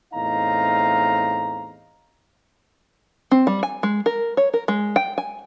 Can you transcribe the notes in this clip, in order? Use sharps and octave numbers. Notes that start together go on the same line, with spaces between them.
E2 A2 C4 D#4 F5 A#5
C4
G3
G#5
G#3
A#4
C#5
A#4
G#3
G5
G#5